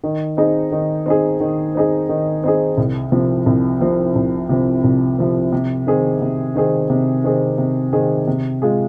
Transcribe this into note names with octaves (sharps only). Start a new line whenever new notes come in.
D#3
C4 D#4 G#4
D#3
C4 D#4 G#4
D#3
C4 D#4 G#4
D#3
C4 D#4 G#4
C2
C3 F3 C4
C2
C3 F3 C4
C2
C3 F3 C4
C2
C3 F3 C4
C3
D#3 C4 G#4
C3
D#3 C4 G#4
C3
D#3 C4 G#4
C3
D#3 C4 G#4
C3
G#3 F4 G#4